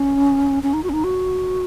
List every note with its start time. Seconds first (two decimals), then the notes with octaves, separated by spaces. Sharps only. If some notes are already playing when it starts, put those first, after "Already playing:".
Already playing: C#4
0.63 C#4
0.73 D#4
0.83 F#4
0.89 C#4
0.93 D#4
1.04 F#4